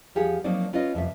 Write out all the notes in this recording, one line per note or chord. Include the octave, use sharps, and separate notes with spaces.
E2 F3 G4 G#4 F#5
F3 F#3 A#3 C4 D#4 D5
C#4 F4 B4 C#5 D#5
F2 C3 A3 E5